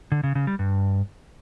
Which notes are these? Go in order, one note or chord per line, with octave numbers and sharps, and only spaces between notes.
D3
C#3
C#3
G3
G2